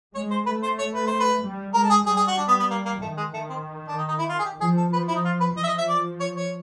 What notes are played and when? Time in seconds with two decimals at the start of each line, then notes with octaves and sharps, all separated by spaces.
0.15 G#3 C#5
0.31 C5
0.46 A3 B4
0.63 C5
0.79 C#5
0.95 B4
1.07 C5
1.20 B4
1.43 G3
1.74 G#3 A#4
1.83 A4
1.90 G#4
2.06 G3 G#4
2.17 G#4
2.28 F#4
2.37 D4
2.48 B3
2.59 B3
2.70 A#3
2.86 A#3
3.01 D#3 A3
3.17 G#3
3.34 D#3 A3
3.50 C4
3.88 D4
3.98 D#4
4.08 D#4
4.19 E4
4.29 F4
4.39 G#4
4.45 G4
4.61 F3 G#4
4.77 A4
4.93 F3 B4
5.08 E4
5.15 D#4
5.25 F4
5.40 B4
5.57 F3 D#5
5.63 E5
5.67 D#5
5.78 E5
5.89 D5
6.20 C#5
6.37 C#5